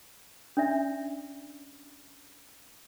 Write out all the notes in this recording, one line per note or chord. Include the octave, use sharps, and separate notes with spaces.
C#4 D4 D5 E5